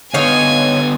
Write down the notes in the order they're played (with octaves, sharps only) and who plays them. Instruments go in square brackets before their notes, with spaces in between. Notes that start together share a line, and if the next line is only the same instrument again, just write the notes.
[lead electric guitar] D3 B3 [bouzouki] D#4 C#5 F5 [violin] G#5